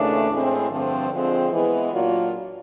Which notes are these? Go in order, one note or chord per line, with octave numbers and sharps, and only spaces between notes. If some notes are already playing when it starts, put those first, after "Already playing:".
Already playing: D#2 C#3 E3 A3 D4
A2 E3 G#3 C4
G2 D3 F3 A3 C4
D3 F3 G#3 C4
E3 G#3 B3
A#2 F#3 A#3 D4 F4